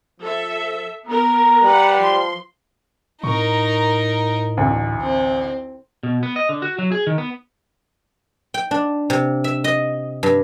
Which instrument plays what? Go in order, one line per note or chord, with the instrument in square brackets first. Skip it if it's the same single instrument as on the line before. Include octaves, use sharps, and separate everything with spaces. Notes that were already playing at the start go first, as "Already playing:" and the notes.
[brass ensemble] F3 [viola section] A4 E5
[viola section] B3 A#4 [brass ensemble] A#5
[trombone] G3 [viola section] B4 F#5
[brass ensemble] F3 [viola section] C6
[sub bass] A2 [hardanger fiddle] D#4 A#4 [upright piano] C#6
[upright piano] A1 D2
[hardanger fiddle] C4
[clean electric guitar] B2
B3
D#5
D3
F#4
F#3
G#4
D#3
B3
[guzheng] G5
D4
C3
E5
D#5
G2